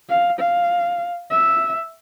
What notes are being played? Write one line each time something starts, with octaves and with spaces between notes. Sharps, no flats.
F5
F5
E5